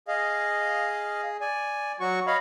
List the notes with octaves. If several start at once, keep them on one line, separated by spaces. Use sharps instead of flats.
G#4 D#5 F5
D5 G#5
F#3 F#4 C#6
C#5 D#5 F5 B5